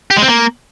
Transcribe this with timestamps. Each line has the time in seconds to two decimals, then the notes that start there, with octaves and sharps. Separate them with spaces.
0.11 G4
0.16 G#3
0.22 C4
0.28 A#3